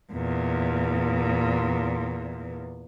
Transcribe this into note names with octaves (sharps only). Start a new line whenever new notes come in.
E2 A#2